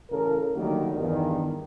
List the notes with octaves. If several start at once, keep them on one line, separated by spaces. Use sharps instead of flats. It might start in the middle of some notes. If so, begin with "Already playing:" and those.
A1 C#3 A4 A#4
D3 D#3 F#3 G3 A3 A#3
E2 G2 D#3